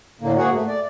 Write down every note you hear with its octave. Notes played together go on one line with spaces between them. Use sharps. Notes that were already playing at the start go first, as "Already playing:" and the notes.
A2 D3 A#3
G#2 A#3 F#4 G#4 F#5
A3
D5